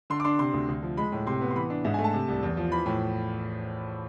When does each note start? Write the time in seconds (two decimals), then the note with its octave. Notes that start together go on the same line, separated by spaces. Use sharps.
0.10 D3 C6
0.20 D6
0.25 D4 C6
0.39 C3 C6
0.54 D2
0.69 D2
0.83 F3
0.97 G#3 B5
1.12 A2
1.27 C3 C6
1.41 B3
1.51 C6
1.55 E3 B5
1.70 D4
1.84 G#2 E5
1.94 G#5
1.99 A3
2.04 A5
2.13 C3
2.28 C2
2.43 E2
2.57 F3
2.71 E3 B5
2.86 A2